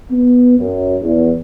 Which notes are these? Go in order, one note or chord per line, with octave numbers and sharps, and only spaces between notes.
B3
F#2
E2